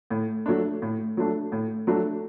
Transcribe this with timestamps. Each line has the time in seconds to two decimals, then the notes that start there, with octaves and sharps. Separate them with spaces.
0.10 A2
0.46 F#3 A3 D4
0.82 A2
1.17 F#3 A3 D4
1.52 A2
1.87 F#3 A3 D4